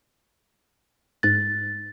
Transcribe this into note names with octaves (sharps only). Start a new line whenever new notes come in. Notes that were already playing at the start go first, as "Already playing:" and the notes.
G#2 F#6 A6